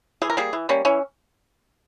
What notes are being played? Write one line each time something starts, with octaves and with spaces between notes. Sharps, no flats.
E3 G#4
A#4
G3 A#3 G#4
E3
G3 A#3 C#4
E3 C#4